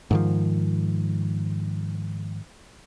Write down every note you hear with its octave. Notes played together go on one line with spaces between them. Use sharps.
G#2 D#3 F3